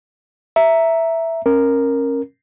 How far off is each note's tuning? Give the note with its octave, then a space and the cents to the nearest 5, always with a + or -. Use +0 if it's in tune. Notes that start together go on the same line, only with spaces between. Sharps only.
E5 +0 A#5 +0
C#4 -25 A#4 +0